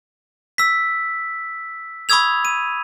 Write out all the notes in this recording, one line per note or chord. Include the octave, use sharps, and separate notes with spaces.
E6 B6
B5 C#6 D#6 E6 G#6 F7
D#7